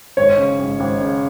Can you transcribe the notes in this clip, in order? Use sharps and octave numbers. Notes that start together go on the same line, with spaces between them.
G#1 C#5
C#3
G#1
G#1
C#3